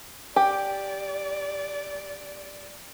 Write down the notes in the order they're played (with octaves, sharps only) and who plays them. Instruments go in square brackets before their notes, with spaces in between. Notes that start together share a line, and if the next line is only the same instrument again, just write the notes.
[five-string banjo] G4 [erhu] D5